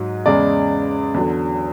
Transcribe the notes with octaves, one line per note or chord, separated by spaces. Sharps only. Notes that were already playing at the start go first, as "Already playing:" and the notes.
Already playing: G#2 F#3
E2 C#3 G#3 D5
E2 D3 F#3